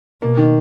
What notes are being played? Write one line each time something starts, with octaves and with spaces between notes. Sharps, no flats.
B2 A#3
D#3